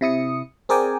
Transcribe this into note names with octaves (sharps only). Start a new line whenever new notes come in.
C3 E4 D#6 C#7
C4 G#4 A#4 D5 G5 G#5